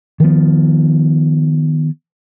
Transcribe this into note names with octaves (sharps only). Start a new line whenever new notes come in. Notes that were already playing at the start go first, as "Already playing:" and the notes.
D#3 F3 B3